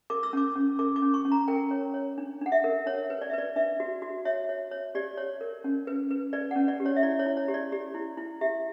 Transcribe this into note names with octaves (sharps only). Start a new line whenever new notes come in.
A#4 D6
E6
C#4 D6
C#4
A#4 D6
D6
C#4
C#6
C#4
A#5
A#4 G5
C#5
C#5
D4
D4 F#5
E5
A#4
D4 C#5
B4
D5
E5
B4 D5
D4 E5
F#4
F#4
C#5 E5
C#5
C#5
G4 D5
C#5
A#4
C#4
B4
B4
B4 D5
C#4 F#5
D5
G4
C#5
E5
E4 D5
C#5
E4
C#5
G4
D5
G4
E4
E4
G4 E5